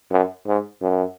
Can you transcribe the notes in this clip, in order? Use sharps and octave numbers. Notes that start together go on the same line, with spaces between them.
F#2
G#2
F#2